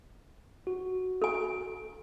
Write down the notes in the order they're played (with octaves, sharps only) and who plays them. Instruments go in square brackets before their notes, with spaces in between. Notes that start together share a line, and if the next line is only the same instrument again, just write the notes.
[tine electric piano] F#4
[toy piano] A4 G#5